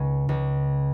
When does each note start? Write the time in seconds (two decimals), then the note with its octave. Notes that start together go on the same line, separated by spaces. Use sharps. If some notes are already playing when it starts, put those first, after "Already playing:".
Already playing: C#2 C#4
0.29 C#2